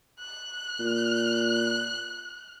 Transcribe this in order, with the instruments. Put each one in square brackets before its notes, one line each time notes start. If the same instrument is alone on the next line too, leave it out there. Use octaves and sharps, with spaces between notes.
[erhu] F#6
[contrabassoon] A#2